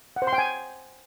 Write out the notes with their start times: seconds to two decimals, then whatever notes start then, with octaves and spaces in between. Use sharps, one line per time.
0.16 F#5
0.22 C5
0.27 C6
0.33 G5
0.38 G#5